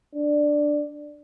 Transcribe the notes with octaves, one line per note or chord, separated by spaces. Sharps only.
D4